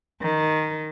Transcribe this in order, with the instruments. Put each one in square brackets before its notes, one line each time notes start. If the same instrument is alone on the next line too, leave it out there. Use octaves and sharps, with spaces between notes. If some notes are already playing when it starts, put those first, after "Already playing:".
[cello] D#3